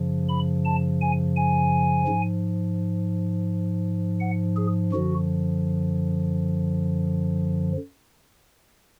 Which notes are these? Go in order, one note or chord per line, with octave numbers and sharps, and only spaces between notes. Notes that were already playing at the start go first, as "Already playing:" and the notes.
Already playing: F#2 C#3 F3
B5
A5
G#5
G#5
G#2 F3
F#5
G#4
F#2 D3 F3 F#4